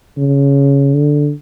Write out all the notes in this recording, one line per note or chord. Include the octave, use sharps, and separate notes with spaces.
C#3
D3